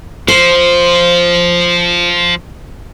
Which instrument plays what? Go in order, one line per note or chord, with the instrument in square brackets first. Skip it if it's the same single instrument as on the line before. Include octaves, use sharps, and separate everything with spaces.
[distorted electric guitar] F3 [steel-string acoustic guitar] C5